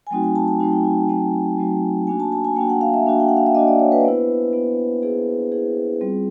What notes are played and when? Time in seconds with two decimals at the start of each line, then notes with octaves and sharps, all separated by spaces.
0.07 G#5
0.11 F#3 A3 C4 D#4 F#4 G5
0.23 G#5
0.36 A5
0.48 A5
0.60 F#3 A3 C4 D#4 F#4 A5
0.72 G5
0.84 G#5
1.09 F#3 A3 C4 D#4 F#4 A5
1.58 F#3 A3 C4 D#4 F#4
2.07 A#3 D4 F#4 G#5
2.20 A5
2.32 A5
2.45 G#5
2.56 A#3 D4 F#4 G5
2.69 F#5
2.81 F5
2.94 E5
3.06 A#3 D4 F#4
3.20 G5
3.29 F#5
3.37 F5
3.46 E5
3.55 A#3 D4 F#4 D#5
3.67 D5
3.80 C#5
3.92 B4
4.01 C5
4.04 B3 E4 B4
4.53 B3 E4
5.03 B3 E4 G#4
5.52 B3 E4 G#4
6.01 G3 C4 F4